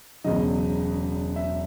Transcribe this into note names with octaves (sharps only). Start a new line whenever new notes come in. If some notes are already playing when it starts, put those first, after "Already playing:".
E1 E2 C#3 F#3 D#5
E5